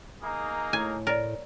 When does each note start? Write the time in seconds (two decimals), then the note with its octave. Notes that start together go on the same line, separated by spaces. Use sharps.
0.22 A#3 D#4 G#4
0.73 A2 G#5
1.07 A#4 C#5 D5